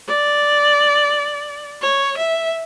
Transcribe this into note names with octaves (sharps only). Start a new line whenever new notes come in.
D5
C#5
E5